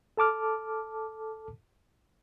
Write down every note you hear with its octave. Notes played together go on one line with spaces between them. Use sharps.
A4 A5 D6 F6